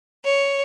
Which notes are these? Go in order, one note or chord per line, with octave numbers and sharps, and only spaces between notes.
C#5